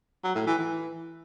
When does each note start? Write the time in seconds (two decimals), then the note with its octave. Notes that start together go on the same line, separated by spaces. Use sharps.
0.24 F#3
0.35 A2
0.47 E3
0.58 E3